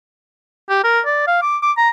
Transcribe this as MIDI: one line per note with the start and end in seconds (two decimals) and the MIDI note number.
0.69 0.83 67
0.84 1.00 70
1.05 1.24 74
1.27 1.40 77
1.42 1.57 86
1.62 1.72 86
1.77 1.89 82